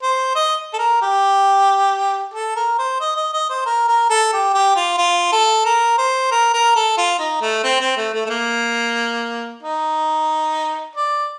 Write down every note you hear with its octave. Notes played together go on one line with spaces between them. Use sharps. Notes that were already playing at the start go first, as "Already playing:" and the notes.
C5
D#5
A4
A#4
G4
A4
A#4
C5
D#5
D#5
D#5
C5
A#4
A#4
A4
G4
G4
F4
F4
A4
A#4
C5
A#4
A#4
A4
F4
D#4
A3
C4
C4
A3
A3
A3
A#3
D#4
D5